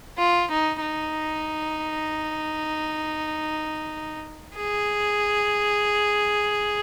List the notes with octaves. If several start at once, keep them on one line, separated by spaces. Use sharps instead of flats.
F4
D#4
D#4
G#4